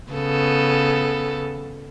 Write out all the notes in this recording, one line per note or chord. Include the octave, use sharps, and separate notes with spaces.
C#3 B3 A4